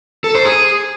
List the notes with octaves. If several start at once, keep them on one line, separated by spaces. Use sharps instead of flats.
A4
C5
G#4